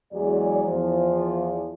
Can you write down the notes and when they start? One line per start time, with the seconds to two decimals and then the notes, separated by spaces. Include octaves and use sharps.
0.12 E2 F#3 G#3 D5
0.65 E2 F3